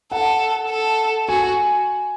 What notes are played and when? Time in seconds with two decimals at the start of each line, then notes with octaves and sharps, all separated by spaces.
0.12 A4 F#5
0.70 A4
1.28 F#4 G#5